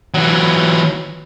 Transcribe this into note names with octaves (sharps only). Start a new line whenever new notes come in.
E3 F#3